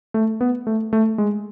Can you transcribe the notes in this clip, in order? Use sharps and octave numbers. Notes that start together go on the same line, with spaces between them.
A3
B3
A3
A3
G#3